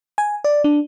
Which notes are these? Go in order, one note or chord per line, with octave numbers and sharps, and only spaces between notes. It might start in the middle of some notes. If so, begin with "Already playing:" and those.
G#5
D5
D4